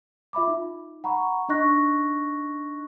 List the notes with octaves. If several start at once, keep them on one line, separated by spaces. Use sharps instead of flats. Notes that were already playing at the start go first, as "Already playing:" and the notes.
F4 E5 B5 D6
D#4
F#5 A#5 B5 C#6
D4 D#4 D#5 C#6 F#6 A#6